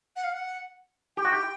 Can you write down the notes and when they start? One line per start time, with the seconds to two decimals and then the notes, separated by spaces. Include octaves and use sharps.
0.16 F#5
0.24 F5
0.32 F#5
1.17 G4 G5
1.25 F#4
1.32 G4